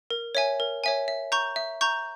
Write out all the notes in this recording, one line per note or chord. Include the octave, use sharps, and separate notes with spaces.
A#4
C#5 E5 G#5
A#4
C#5 E5 G#5
E5
A#5 C#6 G6
E5
A#5 C#6 G6